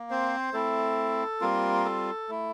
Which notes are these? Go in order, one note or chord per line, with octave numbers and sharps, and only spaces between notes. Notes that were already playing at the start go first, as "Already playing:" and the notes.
Already playing: A#3
C4 C5
A3 C4 E4 A4
G3 A#3 C4 F4 A#4
A4
A3 E4